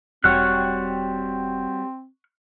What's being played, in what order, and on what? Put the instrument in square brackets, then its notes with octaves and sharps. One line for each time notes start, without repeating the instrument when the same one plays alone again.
[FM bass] E1 [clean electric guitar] G3 F#4 C#5 [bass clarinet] C4 [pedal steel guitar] C#6 F6 F#6